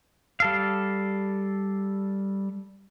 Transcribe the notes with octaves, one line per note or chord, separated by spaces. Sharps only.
G3 A4 F5